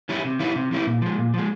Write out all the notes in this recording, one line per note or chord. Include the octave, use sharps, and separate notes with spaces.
E3 G3 C#4 E4
C3
E3 G3 C#4 E4
C3
E3 G3 C#4 E4
A#2
F3 G#3
A#2
F3 G#3